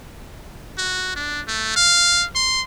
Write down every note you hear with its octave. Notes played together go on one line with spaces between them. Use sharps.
F#4
D4
A3
F5
C6